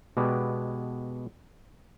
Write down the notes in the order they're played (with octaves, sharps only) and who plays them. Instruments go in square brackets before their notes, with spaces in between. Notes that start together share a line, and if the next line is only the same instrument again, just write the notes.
[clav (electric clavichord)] B2 G#3 B3 G4 D5